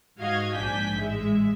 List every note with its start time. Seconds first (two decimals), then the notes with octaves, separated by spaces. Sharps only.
0.18 G#2 F#4 D#5 F5 G#6
0.55 A#1 G#2 D4 G#5 G6 B6
0.95 A1 G#3 E5